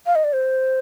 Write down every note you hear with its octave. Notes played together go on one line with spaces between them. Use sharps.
F5
D#5
D5
C5